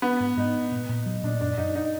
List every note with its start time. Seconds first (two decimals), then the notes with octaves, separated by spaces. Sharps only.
0.02 B3 D4
0.20 G#2
0.37 G#2 D#4
0.55 D4
0.71 A#2
0.89 A#2
1.06 F#3
1.23 A#2 D4
1.41 F#2 D4
1.58 F#2 D#4
1.75 D4 D#4